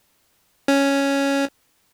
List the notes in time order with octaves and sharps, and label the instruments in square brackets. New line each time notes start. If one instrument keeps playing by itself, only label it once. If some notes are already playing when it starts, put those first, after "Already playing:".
[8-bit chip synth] C#4